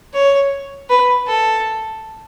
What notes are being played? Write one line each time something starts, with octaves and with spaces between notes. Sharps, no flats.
C#5
B4
A4